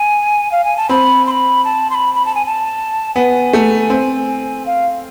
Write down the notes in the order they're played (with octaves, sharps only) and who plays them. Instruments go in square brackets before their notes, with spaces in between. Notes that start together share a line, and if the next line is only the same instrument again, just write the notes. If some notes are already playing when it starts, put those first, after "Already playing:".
Already playing: [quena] G#5
F5
G#5
A5
[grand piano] C4 [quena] B5
[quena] C6
B5
A5
C6
B5
B5
A5
G#5
A5
[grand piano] B3 [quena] G#5
[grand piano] A3
C4
[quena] F5